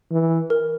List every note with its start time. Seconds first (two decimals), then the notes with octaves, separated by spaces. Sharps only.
0.12 E3
0.50 A#4